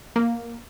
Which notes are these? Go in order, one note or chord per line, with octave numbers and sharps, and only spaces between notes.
A#3